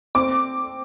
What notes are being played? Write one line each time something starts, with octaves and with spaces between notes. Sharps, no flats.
C4 D6